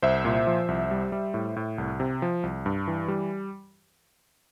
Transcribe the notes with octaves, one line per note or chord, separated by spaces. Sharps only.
C2 C5 E5
A#2
F3
C2
G3
G3
A2
A2
C2
C3
F3
C2
G2
E3
G3